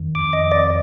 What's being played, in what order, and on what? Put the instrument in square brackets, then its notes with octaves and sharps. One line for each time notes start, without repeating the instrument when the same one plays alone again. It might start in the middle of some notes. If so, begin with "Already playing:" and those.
Already playing: [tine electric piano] F2 D#3
[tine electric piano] F2 [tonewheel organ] D6
[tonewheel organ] D#5
[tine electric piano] F2
[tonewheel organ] D5